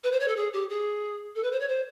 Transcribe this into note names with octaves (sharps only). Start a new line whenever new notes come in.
B4
C5
C#5
A4
G#4
G4
G#4
A4
B4
C5
C#5
C5